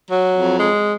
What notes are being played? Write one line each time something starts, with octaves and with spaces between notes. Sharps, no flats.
F#3
F2
G#3